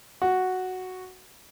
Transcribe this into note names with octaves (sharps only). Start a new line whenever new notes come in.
F#4